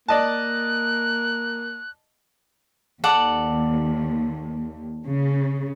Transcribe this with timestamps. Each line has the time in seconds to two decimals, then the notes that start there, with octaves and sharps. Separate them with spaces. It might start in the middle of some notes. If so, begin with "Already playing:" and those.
0.08 A#3 D5 D#5 A5 F#6
3.04 D#2 A4 D5 F#5
5.06 C#3